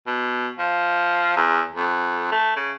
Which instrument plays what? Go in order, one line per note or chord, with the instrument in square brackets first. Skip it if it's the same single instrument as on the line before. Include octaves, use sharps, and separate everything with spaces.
[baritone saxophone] B2
F3
E2
F2
A3
C#3